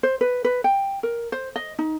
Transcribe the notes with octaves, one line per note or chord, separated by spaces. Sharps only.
C5
B4
B4
G5
A#4
C5
D#5
D#4